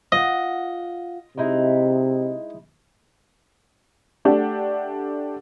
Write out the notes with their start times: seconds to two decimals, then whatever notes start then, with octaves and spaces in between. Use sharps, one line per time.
0.12 F4 D#5 F#5
1.37 C3 G#3 D#4 E4
4.25 A3 D4 G4 F#5